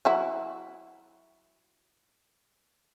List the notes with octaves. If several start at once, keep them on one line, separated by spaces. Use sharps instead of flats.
F#3 E4 F#4